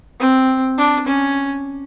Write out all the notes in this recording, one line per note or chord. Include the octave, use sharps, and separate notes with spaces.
C4
D4
C#4